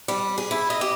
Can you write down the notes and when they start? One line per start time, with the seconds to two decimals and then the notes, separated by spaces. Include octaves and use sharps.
0.08 G3
0.38 G#4
0.51 E4
0.70 D#5
0.81 G4